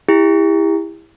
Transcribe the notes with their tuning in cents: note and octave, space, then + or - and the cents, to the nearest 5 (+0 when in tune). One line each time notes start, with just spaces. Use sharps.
E4 +0 G4 +40